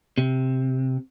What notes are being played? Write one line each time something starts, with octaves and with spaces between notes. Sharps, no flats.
C3